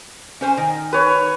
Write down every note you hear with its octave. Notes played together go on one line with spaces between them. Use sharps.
C#4 C5 G#5
D#3
B4 C#5